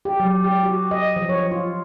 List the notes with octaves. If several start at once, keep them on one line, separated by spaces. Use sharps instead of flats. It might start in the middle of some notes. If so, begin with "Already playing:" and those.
G4
F#3
G4
F#4
D#5
F3
C#5
F4